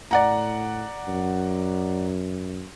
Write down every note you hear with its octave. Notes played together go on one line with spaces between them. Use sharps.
A2 D5 F#5 A#5
F#2